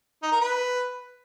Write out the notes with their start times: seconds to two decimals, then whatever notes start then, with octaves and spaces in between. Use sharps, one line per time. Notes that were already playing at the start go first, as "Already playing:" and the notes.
0.23 D#4
0.32 A#4
0.41 B4